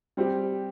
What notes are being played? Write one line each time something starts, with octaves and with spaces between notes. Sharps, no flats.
G3 C4 G4